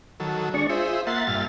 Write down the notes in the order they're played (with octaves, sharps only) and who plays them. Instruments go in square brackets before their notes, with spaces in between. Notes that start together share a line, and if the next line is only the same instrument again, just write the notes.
[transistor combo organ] D#3 F#3 A4
[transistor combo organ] G#3 [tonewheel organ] D4 D5 C#6
[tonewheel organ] F4 [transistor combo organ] G#4 C5 E5
[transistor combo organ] A#3 F#5 C6 [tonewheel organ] E5 A6
[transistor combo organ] G2 A#2 F6